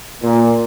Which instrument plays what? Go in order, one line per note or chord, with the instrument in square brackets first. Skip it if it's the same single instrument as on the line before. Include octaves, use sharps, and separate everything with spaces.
[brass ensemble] A#2